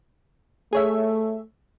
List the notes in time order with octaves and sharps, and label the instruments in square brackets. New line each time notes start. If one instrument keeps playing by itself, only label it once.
[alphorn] A3 [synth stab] G#4 C#5 E5